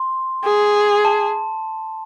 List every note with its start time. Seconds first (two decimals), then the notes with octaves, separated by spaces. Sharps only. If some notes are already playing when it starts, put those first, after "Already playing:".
Already playing: C6
0.44 G#4
1.05 A5